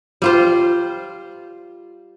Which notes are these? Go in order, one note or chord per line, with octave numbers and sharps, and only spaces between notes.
G3 F4 C5